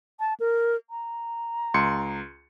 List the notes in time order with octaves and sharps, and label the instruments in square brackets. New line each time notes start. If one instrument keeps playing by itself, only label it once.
[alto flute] A5
A#4
A#5
[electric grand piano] C#2 C6 C#7